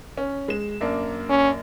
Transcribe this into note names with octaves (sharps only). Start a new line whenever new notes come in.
C#4
G#3 E7
F#2 A#3 D4
C#4